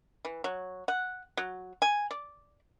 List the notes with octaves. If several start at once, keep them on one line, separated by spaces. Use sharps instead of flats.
E3
F#3
F#5
F#3
G#5
D5